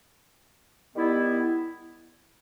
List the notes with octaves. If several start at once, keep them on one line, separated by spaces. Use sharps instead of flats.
D#3 G3 B3 E4